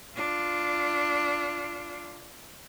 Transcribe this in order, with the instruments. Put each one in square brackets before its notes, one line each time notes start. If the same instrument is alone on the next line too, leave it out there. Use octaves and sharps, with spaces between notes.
[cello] D4 F4